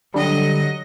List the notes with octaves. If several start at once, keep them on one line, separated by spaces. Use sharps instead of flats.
D3 F#3 G3 D#5